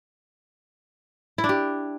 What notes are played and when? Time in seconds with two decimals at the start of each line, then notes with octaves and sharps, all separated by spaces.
1.38 E4
1.44 D4
1.49 G4